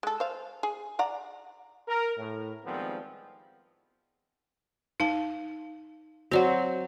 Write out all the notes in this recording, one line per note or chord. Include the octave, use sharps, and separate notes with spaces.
G#3 A4
C5 F5
G#4
D5 F#5 A#5
A#4
A2
D#3 F3 G3 G#3 B3 C4
D#4 F5 A5
F#3 C4 F#4 D5 F#5